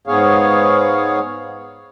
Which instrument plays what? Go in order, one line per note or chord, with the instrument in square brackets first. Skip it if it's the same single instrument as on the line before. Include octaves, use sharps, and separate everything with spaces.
[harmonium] G#2 B3 G#4 C#5 F5